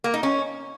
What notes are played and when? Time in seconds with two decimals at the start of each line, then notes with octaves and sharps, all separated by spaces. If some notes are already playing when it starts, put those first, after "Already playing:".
0.04 A#3
0.14 D#4
0.23 C#4